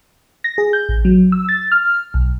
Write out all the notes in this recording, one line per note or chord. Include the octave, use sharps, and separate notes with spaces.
A#6
G#4
G6
A1
F#3
E6
A6
F6
B1